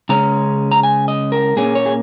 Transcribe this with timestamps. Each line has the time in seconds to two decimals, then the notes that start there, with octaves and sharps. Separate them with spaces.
0.09 C#3 G#3 C#4 A#5
0.71 A#5
0.83 G#5
1.08 D#5
1.32 A#4
1.56 A#2 A#3 C#4 G#4
1.75 C#5
1.86 G#4